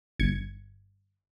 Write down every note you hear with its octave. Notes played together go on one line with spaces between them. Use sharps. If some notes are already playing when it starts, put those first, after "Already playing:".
G1 G#6 C#7